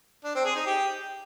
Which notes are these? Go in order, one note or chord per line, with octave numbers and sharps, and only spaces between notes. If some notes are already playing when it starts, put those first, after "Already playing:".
D4
C4
G#4
D#4
G4